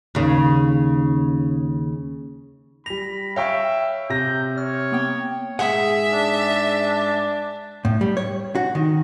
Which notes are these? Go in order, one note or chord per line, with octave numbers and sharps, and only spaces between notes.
D#2 C#3
G3 B5 A#6 F7
C#5 E5 F5 G5 C#6
C3 G6 A#6
C#5 F6
A#3 B3 G5
G#2 G#4 E5 F#5
D4
A2
G3
C#5
F#4
D#3